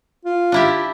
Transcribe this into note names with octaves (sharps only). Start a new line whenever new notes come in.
F4
D4 E4 G4